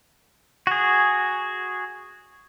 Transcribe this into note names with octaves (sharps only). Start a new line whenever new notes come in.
F#4 G#4